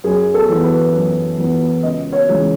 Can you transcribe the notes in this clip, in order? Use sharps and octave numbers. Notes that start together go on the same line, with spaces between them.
F#2 G#4
A4
E3 B3
B4
F#2
E3 B3
C#2 D#5
C#5
C#3 E3 G#3